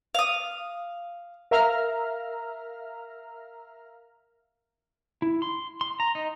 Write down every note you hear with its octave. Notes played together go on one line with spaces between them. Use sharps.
F5 D#6
A#4 E5 F5 A#5 F6
E4
C6
C6
A#5
D#4